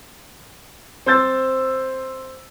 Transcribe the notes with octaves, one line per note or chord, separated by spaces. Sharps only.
C4 C5 E6 G6 A6